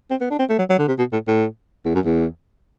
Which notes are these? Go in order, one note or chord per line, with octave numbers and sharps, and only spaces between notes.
C4
B3
D4
C4
A3
F#3
F#3
D3
C3
B2
A2
A2
E2
F#2
E2